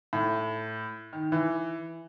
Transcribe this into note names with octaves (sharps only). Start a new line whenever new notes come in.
A2
D#3
E3